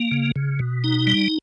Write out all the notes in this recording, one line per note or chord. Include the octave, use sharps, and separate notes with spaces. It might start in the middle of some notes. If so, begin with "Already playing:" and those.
Already playing: A#3
C#3
C#3
B2
D#4
G3